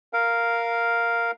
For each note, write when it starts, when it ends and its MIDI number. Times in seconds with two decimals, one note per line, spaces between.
0.13 1.31 70
0.13 1.31 77